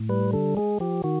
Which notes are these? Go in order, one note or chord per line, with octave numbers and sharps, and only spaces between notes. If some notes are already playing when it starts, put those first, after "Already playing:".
Already playing: A2
G3 B4
D3 A4
G#3 G#4
F3 G4
D#3 F#4